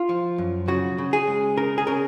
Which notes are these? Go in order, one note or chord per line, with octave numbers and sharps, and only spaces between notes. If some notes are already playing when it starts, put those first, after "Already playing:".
Already playing: F4
F3
F#2
C#3 F#4
C#3
G#4
G#3
C#3 A#4
G#4
C#3 A#4